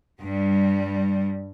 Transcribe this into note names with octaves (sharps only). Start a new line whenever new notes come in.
G2 G3